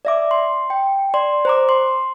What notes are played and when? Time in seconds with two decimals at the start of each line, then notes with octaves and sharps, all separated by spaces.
0.05 D5 E5 D6
0.31 C6
0.70 G5
1.14 D5 C6
1.45 C5 A#5 D6
1.69 C6